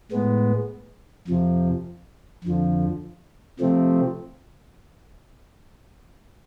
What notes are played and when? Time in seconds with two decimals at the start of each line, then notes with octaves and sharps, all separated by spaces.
0.12 A2 G#3 B3
1.28 F2 C3 F3
2.44 F2 D3 F3
3.60 C3 F3 A3 C4